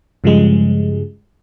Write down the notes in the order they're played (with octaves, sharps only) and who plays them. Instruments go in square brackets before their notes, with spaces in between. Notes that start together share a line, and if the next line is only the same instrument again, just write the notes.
[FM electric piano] G2 C#3 F3 G3 G#3